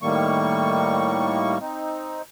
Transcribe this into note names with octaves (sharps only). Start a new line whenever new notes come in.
A2 D#3 G3 A#3 C#6
C4 D#4